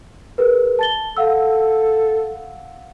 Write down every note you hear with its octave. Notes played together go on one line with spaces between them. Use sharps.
G#4 A#4 B4
A5 A6 G7
A4 F5 F#5 E6